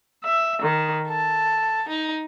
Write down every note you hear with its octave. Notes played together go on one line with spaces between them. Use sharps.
E5
D#3
A4
D#4